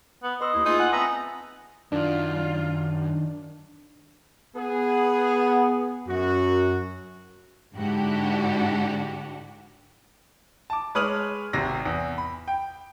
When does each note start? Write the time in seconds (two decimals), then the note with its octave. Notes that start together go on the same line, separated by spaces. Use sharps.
0.23 B3
0.41 B4 D#5 C6 E6
0.54 D#2 E4
0.66 A3 A#3 D#4 F4 G#4
0.79 F#5 G#5
0.93 B3 C4 E5 A5 A#5 D#6 F#6 A#6
1.92 F#2 D#3 D4 F4
4.56 B3 G#4
6.08 F#2 F#4
7.74 G#2 D3 D4 E4 F#4 G4
10.70 A5 D6
10.95 G#3 B4 C#5 D#6 F6 F#7
11.53 G#1 C3 A#6
11.85 E2
12.18 B5
12.48 G5